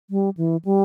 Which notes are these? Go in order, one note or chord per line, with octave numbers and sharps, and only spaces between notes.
G3
E3
G3